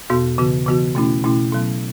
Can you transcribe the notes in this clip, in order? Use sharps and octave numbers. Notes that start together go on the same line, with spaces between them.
E2 B2 B3 F#4
C#3 E3 B3 F#4
C#3 E3 B3 F#4
B2 A3 C#4 E4
B2 A3 C#4 E4
B2 F#3 B3